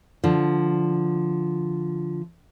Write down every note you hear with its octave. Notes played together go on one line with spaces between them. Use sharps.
D3 F3